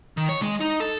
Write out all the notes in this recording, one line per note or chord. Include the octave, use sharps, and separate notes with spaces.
D#3
C#5
G#3
D#4
A4